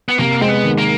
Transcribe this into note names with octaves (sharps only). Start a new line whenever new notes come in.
B3
C3 A#3
G#3 C4
B3
D#3
A#3